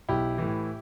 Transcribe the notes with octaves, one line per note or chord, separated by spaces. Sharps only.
B1 E4 G4
A2 E3